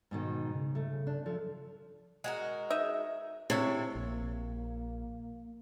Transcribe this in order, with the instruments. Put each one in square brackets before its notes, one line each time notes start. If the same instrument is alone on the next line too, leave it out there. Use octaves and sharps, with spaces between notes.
[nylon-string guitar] G#2 B2 D#3
[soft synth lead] C#3
[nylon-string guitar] A3
[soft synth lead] C#3
[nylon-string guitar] D4
[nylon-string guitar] F3 [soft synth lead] A4
[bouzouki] G#3 F#4 A#4
[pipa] D#4 D#5 E5
[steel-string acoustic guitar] C3 [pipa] D4 [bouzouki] E4 C#5 E5
[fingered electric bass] A#1 [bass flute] A#3